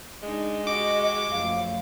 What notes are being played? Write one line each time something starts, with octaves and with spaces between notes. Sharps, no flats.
G#3 D4 D#4
F#4 G4 D#5 D6
F#2 F3 A3 F5